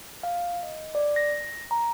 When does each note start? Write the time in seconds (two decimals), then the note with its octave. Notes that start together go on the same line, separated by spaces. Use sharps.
0.23 F5
0.63 D#5
0.95 D5
1.16 A#6
1.71 A#5